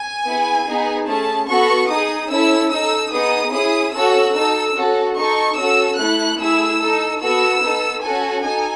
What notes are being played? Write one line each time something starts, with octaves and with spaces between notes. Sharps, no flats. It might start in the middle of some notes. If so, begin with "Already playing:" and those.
Already playing: G#5
B3 E4 G#4
B3 D#4 G#4
A3 C#4 G#4 A5
B3 F#4 A4 C#6
D#4 G#4 D#6
C#4 E4 A4 E6
D#4 A4 E6
B3 D#4 G#4 D#6
C#4 E4 G#4 D#6
C#4 F#4 A4 E6
D#4 A4 E6
C#4 F#4 A4
D#4 A4 C#6
C#4 F#4 A4 E6
A3 E4 A4 F#6
A3 E4 G#4 E6
D#4 A4
B3 F#4 A4 E6
B3 D#4 A4
C#4 F#4 A4 G#5
D#4 A4 G#5